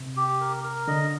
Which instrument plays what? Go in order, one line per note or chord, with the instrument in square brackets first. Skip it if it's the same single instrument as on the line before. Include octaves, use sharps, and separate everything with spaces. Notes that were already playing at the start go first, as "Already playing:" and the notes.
Already playing: [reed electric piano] C3
[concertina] G4
A#4
A#4
[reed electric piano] D3 [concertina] D#5